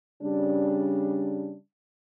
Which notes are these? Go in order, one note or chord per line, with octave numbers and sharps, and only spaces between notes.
C#3 G3 D4